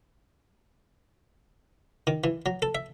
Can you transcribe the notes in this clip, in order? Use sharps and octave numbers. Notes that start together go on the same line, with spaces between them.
D#3
E3
F#3
A4
E5